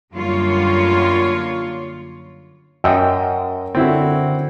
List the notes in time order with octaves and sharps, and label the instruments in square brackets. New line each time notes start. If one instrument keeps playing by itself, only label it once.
[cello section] F#2 D3 G3 A#3 F4 C#5
[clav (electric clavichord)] F#2 [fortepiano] D#5 G5 E6
[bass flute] D3 [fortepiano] C4 E4 F#4